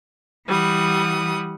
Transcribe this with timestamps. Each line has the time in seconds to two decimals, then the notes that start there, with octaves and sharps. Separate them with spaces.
0.47 E3 G3 F#5 D#6